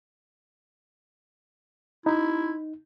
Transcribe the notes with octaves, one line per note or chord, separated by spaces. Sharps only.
D#4 E4